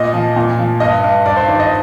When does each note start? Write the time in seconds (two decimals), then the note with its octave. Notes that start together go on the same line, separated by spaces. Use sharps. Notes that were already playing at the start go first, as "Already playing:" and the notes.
Already playing: A#2 D#5
0.14 F3
0.36 A#2
0.59 F3
0.80 G2 D#5
1.04 G2
1.26 G2 D5
1.37 C5
1.48 D#3 D5
1.60 D#5